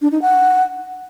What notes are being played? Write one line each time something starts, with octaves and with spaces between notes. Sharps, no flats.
D4
D#4
F#5